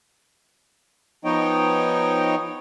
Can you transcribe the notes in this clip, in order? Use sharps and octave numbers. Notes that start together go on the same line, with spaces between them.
F3 B3 D#4 C#5 D#5 G5